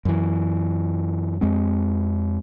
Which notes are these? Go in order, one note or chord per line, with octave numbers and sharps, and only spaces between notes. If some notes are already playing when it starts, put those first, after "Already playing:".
F#2 E3
F2 G#3 C4